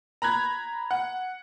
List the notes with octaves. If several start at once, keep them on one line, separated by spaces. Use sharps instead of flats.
A#5 B5 F#6 G#6
F#5